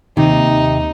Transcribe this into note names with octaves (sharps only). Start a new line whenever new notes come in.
D#2 C3 D#4